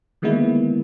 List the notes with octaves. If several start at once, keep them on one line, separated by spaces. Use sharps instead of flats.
D3 D#3 G#3 A#3 B3 E4